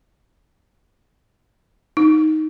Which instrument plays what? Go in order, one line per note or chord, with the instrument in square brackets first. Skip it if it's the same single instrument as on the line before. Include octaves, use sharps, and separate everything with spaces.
[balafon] D#4